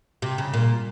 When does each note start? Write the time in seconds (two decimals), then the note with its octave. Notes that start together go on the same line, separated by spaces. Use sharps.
0.22 C3
0.38 C#3
0.53 A#2